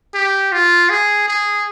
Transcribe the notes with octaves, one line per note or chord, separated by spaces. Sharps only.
G4
F4
G#4
G#4